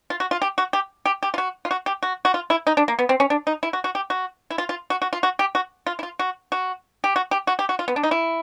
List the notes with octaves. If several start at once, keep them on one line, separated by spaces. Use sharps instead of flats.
F4
F#4
F4
G4
F#4
G4
G4
G4
F4
F#4
F4
F#4
G4
F#4
F#4
F4
E4
D#4
D4
A#3
B3
C4
C#4
D4
D#4
E4
F#4
F#4
G4
F#4
E4
F4
F4
F#4
F#4
F4
F#4
G4
F#4
F4
E4
F4
F#4
F#4
G4
F#4
G4
F#4
G4
F#4
F4
B3
D4
D#4
E4